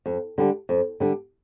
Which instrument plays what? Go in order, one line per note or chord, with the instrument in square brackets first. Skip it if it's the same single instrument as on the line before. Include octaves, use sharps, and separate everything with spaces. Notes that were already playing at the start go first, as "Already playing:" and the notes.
[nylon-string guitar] F2
D3 G3 D4
F2
D3 G3 D4